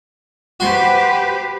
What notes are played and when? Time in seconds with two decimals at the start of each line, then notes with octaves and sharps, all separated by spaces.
0.60 F#4 G4 B4 C5 C6